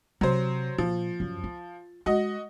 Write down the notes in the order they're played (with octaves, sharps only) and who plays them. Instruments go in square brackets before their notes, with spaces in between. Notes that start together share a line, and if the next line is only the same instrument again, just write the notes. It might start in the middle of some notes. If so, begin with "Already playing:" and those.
[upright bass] C3 [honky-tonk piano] F#3 C5
[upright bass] A#2 [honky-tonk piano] F3
[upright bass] F#2
F4
[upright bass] G#3 [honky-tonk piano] F#4 D#5